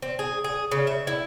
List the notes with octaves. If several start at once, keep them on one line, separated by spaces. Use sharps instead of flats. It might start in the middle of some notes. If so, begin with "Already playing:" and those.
C4
G#4
G#4
C#3
E5
E4